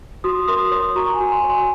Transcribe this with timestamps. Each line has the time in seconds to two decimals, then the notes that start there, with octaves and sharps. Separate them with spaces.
0.24 F#4 C6 D#6
0.47 A#4 C6 D#6
0.72 C#5 C6 D#6
0.95 F#4 A#5 C#6
1.07 A#5
1.13 G#5 C6
1.20 F#4
1.32 G#5 C6
1.44 C#5
1.50 G#5 C6